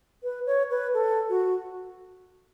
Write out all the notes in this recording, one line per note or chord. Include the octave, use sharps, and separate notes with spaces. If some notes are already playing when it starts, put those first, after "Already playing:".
B4
C#5
B4
A4
F#4